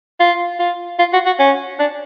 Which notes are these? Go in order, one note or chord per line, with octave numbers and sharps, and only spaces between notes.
F4
F4
F4
F#4
F#4
C#4
D4